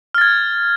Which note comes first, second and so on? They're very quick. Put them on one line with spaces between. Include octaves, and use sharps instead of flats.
F6 A6 G#6